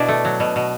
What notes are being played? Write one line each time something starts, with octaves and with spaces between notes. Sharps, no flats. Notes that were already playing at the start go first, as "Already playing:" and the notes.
Already playing: B2 D4 E4
A3
F#3
B2
B2